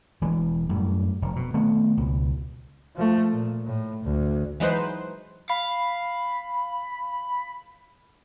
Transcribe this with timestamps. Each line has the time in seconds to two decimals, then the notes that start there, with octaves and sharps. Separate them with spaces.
0.21 E1 E3 G#3
0.69 F#2 A2 G3
1.22 F1
1.36 B2
1.54 D#3 A3 B3 C4
1.97 C#2 B2
2.96 F3 A3
3.32 A#2
3.66 A2
4.04 D2
4.60 E3 F#3 G#3 D#4 B4 C5
5.50 F5 B5